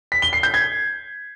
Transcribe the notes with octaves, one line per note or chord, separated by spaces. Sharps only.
B6
G7
C7
G6
G#6